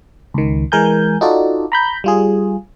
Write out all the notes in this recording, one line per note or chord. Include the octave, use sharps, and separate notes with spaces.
C#2 D#3
E3 G#3 A#4 G#5 G6
D#4 F4 F#4 A4 D5
A#5 B5 G6
G3 F4 G#4